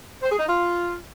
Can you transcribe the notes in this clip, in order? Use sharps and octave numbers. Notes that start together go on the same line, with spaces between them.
C5
G#4
D#4
F4